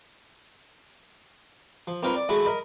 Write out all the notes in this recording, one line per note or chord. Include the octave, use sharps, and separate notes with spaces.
F3
A#3 C4 D#4 F4 A#4 B4
D5
G#3 A3 E4 F#4 G#4 E5
A#4 D#5 B5